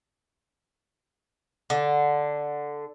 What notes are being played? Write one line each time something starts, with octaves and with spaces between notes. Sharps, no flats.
D3